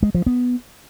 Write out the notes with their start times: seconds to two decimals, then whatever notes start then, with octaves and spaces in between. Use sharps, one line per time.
0.03 G#3
0.15 F3
0.26 B3